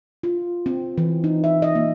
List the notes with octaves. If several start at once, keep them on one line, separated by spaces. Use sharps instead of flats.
F4
C4
E3
D#4
E5
D#5
A#3